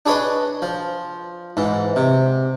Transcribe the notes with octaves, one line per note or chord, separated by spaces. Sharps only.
D4 G#4 B4 C#5 D#5
F3
G#2 E3
C3